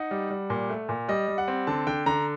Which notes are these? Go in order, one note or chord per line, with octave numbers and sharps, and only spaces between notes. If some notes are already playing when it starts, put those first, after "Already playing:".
Already playing: D#4 F#5
G3
G3
A#2
A3
A#2
G3 D#5
G3
F#5
C4
D3 A5
D3 G5
D3 A#5